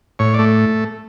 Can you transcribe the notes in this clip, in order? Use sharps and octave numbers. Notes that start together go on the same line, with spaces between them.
A2 C#5
A3 D5